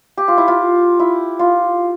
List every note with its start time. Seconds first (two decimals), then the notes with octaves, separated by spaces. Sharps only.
0.17 G4
0.28 F4
0.38 E4
0.48 F4
1.00 E4
1.39 F4